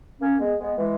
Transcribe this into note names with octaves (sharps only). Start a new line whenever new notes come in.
A#3 C#4
G#3 B3
G#3 B3
E3 G#3